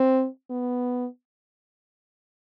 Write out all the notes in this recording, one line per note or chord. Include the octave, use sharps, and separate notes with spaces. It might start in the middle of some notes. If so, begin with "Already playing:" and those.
Already playing: C4
B3